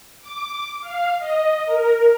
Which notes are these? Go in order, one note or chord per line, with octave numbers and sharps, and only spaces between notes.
D6
F5
D#5
A#4